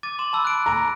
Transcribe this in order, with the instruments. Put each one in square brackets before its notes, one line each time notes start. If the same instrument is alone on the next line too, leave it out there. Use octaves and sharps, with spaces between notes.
[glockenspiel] D6 A6 D#7
C6 D6 E7
A5 B5 E6
F#6 D7
[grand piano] A#5